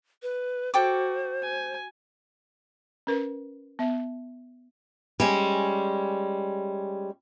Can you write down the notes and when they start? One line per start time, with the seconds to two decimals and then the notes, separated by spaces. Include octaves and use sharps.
0.22 B4
0.74 F#4 A4 C5 G5 D6
1.42 G#5
3.07 C#4 A#4 B4
3.79 B3 E5
5.20 G3 G#3 C#4